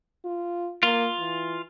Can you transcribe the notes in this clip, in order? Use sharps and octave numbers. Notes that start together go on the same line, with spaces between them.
F4
A#3 F4
E3